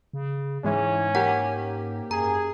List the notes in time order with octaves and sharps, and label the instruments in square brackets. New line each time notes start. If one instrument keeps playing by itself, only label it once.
[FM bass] C#3
[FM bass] G#2 [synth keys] E3 G#3 [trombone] C#4
[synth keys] A#3 G4 [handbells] F#5
[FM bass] F#2 [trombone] G#4 [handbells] A#5